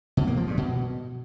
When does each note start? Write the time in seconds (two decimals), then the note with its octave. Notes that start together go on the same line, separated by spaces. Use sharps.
0.17 B2
0.27 A#3
0.37 F3
0.47 G2
0.58 B2